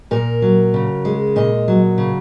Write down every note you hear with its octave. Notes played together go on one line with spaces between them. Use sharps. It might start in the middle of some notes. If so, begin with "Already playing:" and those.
A#2 A#4
F#3
C#3
G#3
A#2 D#5
F#3
C#3